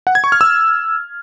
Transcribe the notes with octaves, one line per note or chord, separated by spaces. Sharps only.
F#5
G#6
C#6
F6
E6